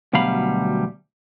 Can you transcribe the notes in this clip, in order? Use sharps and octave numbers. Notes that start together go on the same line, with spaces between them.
D2 B2 F#3 G3 F5 B5